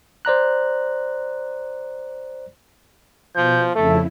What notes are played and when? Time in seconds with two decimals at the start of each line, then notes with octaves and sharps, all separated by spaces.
0.25 C5 D5 A#5 F#6
3.36 B2 F3 G6
3.76 F2 C#3 A3 E4 A4